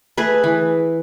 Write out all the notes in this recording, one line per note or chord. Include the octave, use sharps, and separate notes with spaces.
A3 G#4 B4
E3